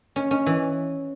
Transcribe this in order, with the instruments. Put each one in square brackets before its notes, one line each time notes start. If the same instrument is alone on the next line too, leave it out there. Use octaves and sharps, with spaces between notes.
[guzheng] C#4
C#4
E3